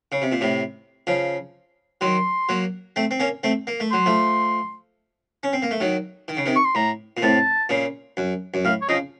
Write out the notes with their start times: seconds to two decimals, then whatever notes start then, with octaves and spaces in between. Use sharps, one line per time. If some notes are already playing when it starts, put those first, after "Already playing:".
0.12 C#3
0.22 C3
0.32 A#2
0.41 A2 C3
1.07 C#3 F3
2.01 D#3 F#3 C6
2.49 F#3 A#3
2.96 A3 C4
3.11 C4
3.20 A#3 C#4
3.43 A3 C4
3.67 A#3
3.80 A3
3.91 F#3 C6
4.06 F3 A3
5.43 C#4
5.53 C4
5.62 A#3
5.71 A3
5.80 D#3 F#3
6.28 D#3
6.37 C#3
6.46 C3 D#3
6.56 C#6
6.65 C6
6.75 A2 A#5
7.17 A#2
7.22 A2 C3 A5
7.69 A#2 C#3
8.17 F#2
8.54 F#2
8.65 A2 F5
8.81 C#5
8.89 C#3 F3 D#5